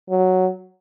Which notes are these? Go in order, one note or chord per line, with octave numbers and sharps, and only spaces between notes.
F#3